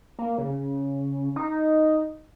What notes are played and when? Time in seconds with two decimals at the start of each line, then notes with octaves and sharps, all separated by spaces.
0.19 A#3
0.38 C#3
1.36 D#4